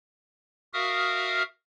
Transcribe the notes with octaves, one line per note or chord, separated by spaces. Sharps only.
F#4 A#4 E5 F5 D#6 F6